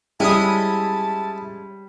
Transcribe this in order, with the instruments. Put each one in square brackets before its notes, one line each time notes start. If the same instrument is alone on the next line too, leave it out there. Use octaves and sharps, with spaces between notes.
[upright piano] G3 [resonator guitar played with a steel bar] G#3 C#4 [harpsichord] E4 D#6 [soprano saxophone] A5